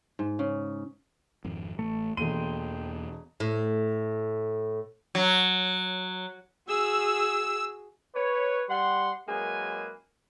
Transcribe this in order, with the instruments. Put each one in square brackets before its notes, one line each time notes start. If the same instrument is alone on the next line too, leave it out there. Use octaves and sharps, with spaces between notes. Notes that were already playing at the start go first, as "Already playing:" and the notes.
[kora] G#2
C#3
[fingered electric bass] G#1 F2
[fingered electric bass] A1 [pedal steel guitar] A3
[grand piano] E1 A3 D#7 [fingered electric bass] E2 A#3 [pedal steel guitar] G5 C6
[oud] A2
[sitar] F#3
[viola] F#4 G#4 [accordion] E6
[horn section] B4 C#5
G3 F#5 C6
F#2 G#3 A#3 G#4 B4 G#5